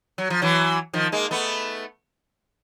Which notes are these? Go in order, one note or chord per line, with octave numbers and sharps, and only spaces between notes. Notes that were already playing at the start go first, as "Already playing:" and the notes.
F#3
F3
E3 F#3
D#3 F3
G#3 A#3
A3 B3